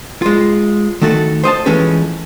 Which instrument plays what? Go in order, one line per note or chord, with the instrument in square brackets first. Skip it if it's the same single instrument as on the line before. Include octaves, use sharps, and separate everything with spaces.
[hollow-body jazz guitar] G#3 F4
D#3 A3 F#4 A4
C5 D#5 F5 A5
E3 F3 G#3 A3 C#4 B4